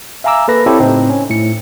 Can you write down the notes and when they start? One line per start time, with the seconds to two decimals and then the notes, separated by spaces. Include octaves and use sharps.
0.24 E5 F5 G#5 A#5 D6 E6
0.48 A#3 A4 B4 B5 A#6
0.66 C4 E4 G4 A4 C5 C#5
0.80 A2 C#3 C4 D#4
1.10 C#4
1.30 A2 C#7